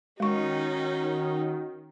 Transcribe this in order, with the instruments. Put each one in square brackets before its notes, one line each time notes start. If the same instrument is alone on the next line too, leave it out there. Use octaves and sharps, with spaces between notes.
[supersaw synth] D#3 [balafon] G#3 C#6 [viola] C#4 D#4 [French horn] F#4